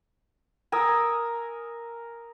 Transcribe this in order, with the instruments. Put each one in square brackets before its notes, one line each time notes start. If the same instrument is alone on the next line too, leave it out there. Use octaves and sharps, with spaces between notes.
[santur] A#4 G#5 D#6 E6